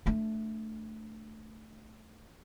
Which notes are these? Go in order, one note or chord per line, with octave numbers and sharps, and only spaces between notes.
A3 D4